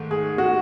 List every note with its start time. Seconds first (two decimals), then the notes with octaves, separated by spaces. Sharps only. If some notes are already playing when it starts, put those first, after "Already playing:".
Already playing: G#2 D#3 A3
0.11 G#4
0.38 F#4